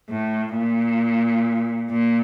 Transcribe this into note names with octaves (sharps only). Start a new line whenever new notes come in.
A2
A#2
A#2